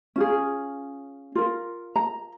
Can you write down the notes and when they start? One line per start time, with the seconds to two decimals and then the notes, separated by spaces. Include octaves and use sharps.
0.16 C#4 F4 G#4
1.35 F4 A#4
1.96 A#5